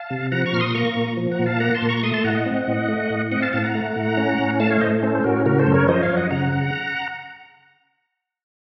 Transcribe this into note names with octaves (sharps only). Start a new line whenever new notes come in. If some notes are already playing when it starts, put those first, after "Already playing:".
Already playing: F5 A5
C3
F3 F#5 A#5
A#5 C#6
A#2 F6
C6 D#6
A#3 A#5 C#6
A#2
F3
F#5 A#5
A#2
F5 A5
A#3 F#5 A#5
A5 C6
A#2
A#5 C#6
A3 C6 D#6
A5 C6
A2 F#5 A#5
D#5 F#5
C4
A2
A3
A2
C4 D#5 F#5
F5 A5
A2 F5 A5
F#5 A#5
A3
A2
C#4
A2
A3 F5 A5
C#5 F5
A2 C5 D#5
C#4 A4 C5
C5
A2 F#4 A#4
C#3 F#4 A#4
A4 C5
F#2
A#4 C#5
F3 C5 D#5
C#5 F5
F#2
D#5 F#5
C#3 F#5 A#5